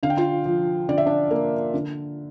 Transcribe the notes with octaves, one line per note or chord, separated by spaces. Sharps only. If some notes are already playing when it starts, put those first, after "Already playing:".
D3 F5
G5
F4 F5
F3
D3 D5
E5
D4 D5
A#3
D3